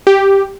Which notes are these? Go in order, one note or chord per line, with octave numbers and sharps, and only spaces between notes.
G4